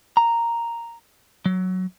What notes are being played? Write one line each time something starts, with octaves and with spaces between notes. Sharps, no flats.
A#5
F#3